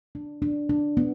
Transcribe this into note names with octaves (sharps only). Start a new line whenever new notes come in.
D4
D4
D4
B3